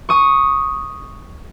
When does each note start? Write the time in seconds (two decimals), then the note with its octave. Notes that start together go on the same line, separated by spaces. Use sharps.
0.09 C#6 D#6